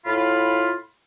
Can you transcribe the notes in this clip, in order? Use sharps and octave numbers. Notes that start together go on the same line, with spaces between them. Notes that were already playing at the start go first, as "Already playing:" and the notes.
A2 F4 B5